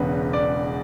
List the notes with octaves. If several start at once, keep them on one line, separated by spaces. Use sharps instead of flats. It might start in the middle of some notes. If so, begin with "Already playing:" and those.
Already playing: E1 E2 C#3 B4
D5